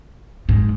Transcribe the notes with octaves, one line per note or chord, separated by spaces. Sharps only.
G#2